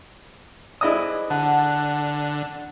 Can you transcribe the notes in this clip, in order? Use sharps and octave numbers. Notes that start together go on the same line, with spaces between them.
E4 G#4 C5 D5 D#5 D#6
D3 F#5 A5